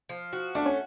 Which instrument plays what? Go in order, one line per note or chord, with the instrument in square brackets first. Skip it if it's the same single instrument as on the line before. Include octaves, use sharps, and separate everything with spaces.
[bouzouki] F3
F#4
[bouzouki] A3 [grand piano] D4
[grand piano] C#4